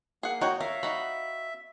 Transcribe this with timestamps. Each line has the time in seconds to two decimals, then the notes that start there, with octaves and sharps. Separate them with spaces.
0.23 A#3 G#4 F#5
0.41 D#4 F#4 C#5 G5
0.60 A#4 E5 F5
0.83 D#4 F#4 B5